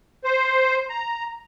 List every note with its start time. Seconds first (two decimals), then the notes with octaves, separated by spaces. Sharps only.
0.24 C5
0.89 A#5